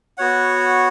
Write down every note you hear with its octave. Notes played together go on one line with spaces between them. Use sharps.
B3 F#4 C#5 F#5